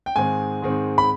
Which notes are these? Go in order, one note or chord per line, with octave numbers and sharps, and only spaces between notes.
G5
G#2 D#3 G#3 C4 G#5
G#2 D#3 G#3 C4
B5